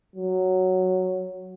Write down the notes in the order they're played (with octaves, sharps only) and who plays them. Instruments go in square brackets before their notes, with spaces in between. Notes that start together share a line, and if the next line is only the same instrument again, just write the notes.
[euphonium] F#3